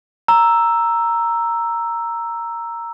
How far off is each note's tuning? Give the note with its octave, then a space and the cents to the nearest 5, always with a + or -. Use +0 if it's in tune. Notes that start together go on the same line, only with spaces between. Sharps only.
A#5 +0 E6 +5